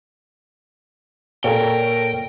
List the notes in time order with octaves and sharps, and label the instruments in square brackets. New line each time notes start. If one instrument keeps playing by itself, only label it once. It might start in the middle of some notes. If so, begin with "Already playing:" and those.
[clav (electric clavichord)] A#2 [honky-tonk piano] A4 C#5 [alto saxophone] A#4 [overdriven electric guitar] G5